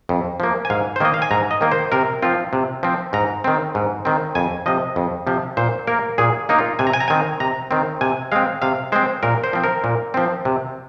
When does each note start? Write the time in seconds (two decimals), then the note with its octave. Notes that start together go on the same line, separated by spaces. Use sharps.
0.09 F2
0.40 F3 A#3
0.65 G#5
0.70 G#2 F5
0.96 C5
1.00 D#3 A#3 D#5
1.14 F5
1.22 G#5
1.31 G#2 A#5
1.51 D#5
1.61 D#3 A#3
1.72 C5
1.92 C3 A#4
2.22 F3 C4 F4
2.53 C3
2.83 F3 C4
3.13 G#2 A#5
3.44 D#3 C4
3.75 G#2
4.05 D#3 C4
4.35 F2 G#5
4.66 C3 F3 D#5
4.96 F2
5.27 C3 F3
5.57 A#2 C5
5.87 A#3 A#4
6.18 A#2 G#4
6.49 A#3 D#4
6.59 F4
6.79 C3 G#5
6.87 A#5
6.93 G#5
7.00 A#5
7.08 D#3 C4 G#5
7.40 C3 A#5
7.71 D#3 C4
8.01 C3 G#5
8.32 G#3 C4 F5
8.62 C3 F5
8.92 G#3 C4 C5
9.23 A#2 A#4
9.44 C5
9.53 F3 C4
9.64 A#4
9.84 A#2
10.14 F3 C4
10.45 C3